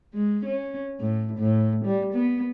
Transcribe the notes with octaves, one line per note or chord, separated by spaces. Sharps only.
G#3
C#4
A2
A2
G3
B3